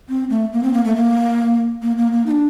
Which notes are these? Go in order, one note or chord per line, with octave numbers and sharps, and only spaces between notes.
C4
A3
A#3
C4
A#3
A3
A#3
A#3
A#3
A#3
D#4
D4